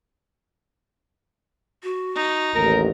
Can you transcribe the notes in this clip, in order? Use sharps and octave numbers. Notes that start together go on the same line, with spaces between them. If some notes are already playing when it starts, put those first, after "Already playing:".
F#4
D#4
A1 D#2 A#4